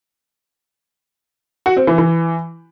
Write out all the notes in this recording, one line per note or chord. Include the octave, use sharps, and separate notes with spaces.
F#4
C4
E3
E3